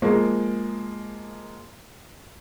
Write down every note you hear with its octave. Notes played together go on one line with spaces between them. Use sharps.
F3 G#3 A#3